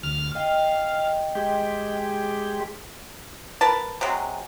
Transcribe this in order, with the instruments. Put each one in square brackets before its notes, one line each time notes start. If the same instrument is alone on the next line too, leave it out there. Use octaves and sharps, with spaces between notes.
[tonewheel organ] D2 F6
[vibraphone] D#5 G5 [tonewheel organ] F5
[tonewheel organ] G#3 G4
[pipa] A#4 B4 A5
C3 F#3 G#3